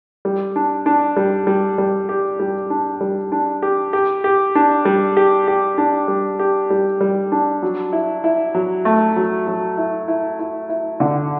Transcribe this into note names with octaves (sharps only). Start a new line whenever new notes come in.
G3
D4
D4
G3
G3
G3
G4
G3
D4
G3
D4
G4
G4
G4
D4
G3
G4
G4
D4
G3
G4
G3
G3
D4
F#3
E4
E4
F#3
A3
F#3
F#3
E4
E4
E4
E4
D3